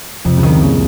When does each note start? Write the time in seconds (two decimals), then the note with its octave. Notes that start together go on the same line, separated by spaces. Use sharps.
0.25 F2 C3 F3
0.37 C#2 C#3
0.43 D#3
0.49 C2 C3
0.61 A#2 C#3